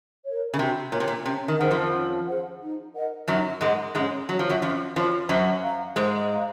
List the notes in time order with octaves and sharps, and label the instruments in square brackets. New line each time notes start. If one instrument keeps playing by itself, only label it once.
[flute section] A#4 C#5
[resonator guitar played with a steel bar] C#3
[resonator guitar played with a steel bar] C3 [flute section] F#4
[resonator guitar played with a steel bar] A#2 [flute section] A#4 C#5
[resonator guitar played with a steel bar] C3
A#2
[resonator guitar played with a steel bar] C3 [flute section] C#4
[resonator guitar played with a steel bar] D#3
[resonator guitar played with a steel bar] D#3 [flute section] G#4 C5 F#5
[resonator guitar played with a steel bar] F2 F3
[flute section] C#4
G#4 C5 F#5
D#4
A#4 D#5 F#5
[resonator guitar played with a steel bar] F#2 F#3 [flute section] D#4
[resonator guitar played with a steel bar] G#2 G#3 [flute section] A#4 D#5 F#5
[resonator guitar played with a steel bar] G#2 G#3 [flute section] C#4
[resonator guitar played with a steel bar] F#3 [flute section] F#4 C#5
[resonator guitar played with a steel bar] F3
F#2 F#3
[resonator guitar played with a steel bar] F2 F3 [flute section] C#4
[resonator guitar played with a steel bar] F2 F3 [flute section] F#4 C#5
[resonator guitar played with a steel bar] F#2 F#3 [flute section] C5
[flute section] F5 A#5
[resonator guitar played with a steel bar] G#2 G#3 [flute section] C5
[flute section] F5 A#5